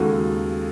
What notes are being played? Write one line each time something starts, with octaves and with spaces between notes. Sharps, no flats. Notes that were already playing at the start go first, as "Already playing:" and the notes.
Already playing: D#2 C#3 G#3 D#4 F#4 A4